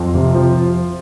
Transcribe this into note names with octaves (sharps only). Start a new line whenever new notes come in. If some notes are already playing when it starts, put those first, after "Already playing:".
Already playing: F2 F4
C3
F3